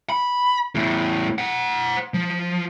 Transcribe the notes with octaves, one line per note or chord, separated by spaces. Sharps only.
B5
E2 A2
C5 F#5
F3